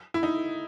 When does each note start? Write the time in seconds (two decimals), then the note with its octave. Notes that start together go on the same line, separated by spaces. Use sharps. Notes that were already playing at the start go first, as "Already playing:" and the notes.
0.14 E4
0.23 D#4